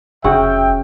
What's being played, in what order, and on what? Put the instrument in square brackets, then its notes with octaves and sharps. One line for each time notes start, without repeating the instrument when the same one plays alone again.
[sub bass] F1 [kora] C#3 F#4 F#5 [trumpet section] E5 G5